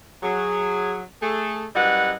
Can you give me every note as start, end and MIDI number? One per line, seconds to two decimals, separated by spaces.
0.23 1.01 54
0.23 1.01 68
1.22 1.66 57
1.22 1.66 68
1.22 1.66 69
1.76 2.14 42
1.76 2.14 55
1.76 2.14 64
1.76 2.14 71
1.76 2.14 75
1.76 2.14 78